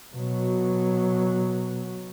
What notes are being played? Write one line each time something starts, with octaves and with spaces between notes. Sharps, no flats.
B2 F#3